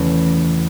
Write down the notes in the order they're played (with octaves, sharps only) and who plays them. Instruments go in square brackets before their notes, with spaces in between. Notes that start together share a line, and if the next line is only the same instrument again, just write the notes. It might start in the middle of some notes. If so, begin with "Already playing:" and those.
Already playing: [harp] E2 C#3 E3 A3